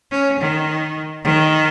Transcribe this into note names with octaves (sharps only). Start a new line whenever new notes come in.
C#4
D#3
D#3